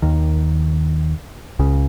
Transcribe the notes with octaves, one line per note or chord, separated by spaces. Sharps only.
D#2 D#3
C#2 C#3